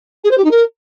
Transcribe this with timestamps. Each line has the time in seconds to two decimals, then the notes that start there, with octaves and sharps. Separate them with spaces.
0.24 G#4
0.31 C5
0.37 G4
0.44 D#4
0.51 A#4